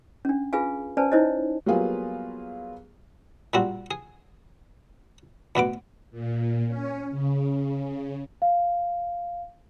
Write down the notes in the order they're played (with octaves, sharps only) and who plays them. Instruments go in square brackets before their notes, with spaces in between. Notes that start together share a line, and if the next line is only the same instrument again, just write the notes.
[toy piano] C#4 D4
F4 G#4 B4 F5 G#5
C#4 B4 C5 D5 G#5 A5
D#4 E4 C5 C#5 D#5
[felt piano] F#3 G3 A#3 B3 F4 G#4
[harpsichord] A#2 G3 C4 F#4
G#4
D2 B2 B3 D6
[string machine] A#2
C#4
C#3
[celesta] F5